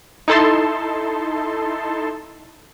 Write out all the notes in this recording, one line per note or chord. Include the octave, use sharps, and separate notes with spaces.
D#4 E4 A4 A5 C6